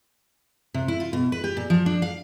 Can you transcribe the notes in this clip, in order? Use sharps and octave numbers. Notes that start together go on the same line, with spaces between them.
C3
E4
F4
B2
B4
G4
A#2
F3
D4
F5